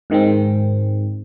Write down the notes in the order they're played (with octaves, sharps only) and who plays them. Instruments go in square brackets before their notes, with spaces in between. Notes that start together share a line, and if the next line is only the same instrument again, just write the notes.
[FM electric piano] G#2 D#3 G#3 C4